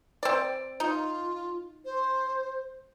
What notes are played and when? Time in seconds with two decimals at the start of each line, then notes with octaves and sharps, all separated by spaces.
0.23 C4 D5
0.80 D#4 F4
1.85 C5